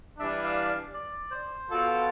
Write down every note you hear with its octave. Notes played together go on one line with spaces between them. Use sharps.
E3 G3 D4 E5
F5
D5
C5
B2 B3 F4 A4